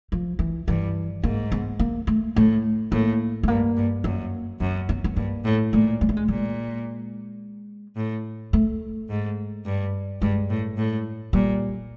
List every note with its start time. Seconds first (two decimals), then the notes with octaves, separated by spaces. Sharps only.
0.12 F3
0.39 E3
0.68 G2 E3
1.24 G#2 A#3
1.52 B3
1.79 A#3
2.07 A3
2.36 A2 A3
2.92 A2 A#3
3.43 A3
3.48 G2 A#3
3.77 G2
4.04 F#2 A#3
4.60 F#2 B3
4.89 B3
5.04 B3
5.16 G2 A#3
5.45 A2
5.72 A#2 A3
6.01 G#3
6.09 A3
6.17 G#3
6.28 A#2 G#3
7.96 A2
8.53 A3
9.09 G#2
9.65 G2
10.22 G2 G#3
10.50 A2
10.78 A2
11.33 A#2 G3